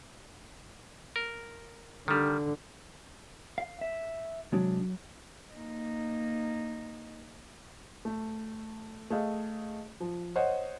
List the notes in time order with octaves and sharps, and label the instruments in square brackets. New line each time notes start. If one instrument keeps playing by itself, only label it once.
[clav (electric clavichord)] A#4
[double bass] D3 [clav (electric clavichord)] D#3 G3
[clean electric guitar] F5
E5
[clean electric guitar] C3 G#3 D4 [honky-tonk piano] F#3
[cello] A#3 D#4
[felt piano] A3
A3 G#4 D#5 F5
F3
C5 C#5 D#5 F#5